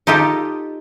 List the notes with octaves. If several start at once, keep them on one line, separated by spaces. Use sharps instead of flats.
D#4 F4 G4 A4 D#5